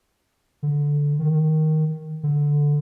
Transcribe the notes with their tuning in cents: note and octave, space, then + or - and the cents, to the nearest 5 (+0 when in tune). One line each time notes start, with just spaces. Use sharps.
D3 -10
D#3 +5
D3 -5